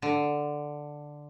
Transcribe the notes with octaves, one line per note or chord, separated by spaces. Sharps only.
D3